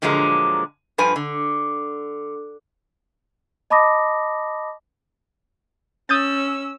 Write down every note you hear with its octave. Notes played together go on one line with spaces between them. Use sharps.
A#2 D3 F3 F#3 G#3 A#3
G2 F3 B4 G#5
D3
D#5 A5 B5 D6 D#6 A#6
C#4 D#6 E6 G6 A6